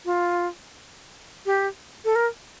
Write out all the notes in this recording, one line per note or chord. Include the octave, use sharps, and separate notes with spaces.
F4
G4
A4
A#4